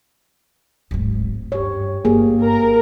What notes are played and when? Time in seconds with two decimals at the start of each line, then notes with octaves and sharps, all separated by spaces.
0.91 D1 G#1
1.52 G2 G4 C#5
2.05 G1 A#3 G4 G#4
2.42 A#4